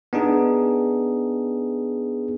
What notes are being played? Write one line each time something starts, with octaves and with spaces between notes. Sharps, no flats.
B3 D4 D#4 G#4